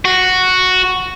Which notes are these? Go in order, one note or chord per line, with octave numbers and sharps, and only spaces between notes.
F#4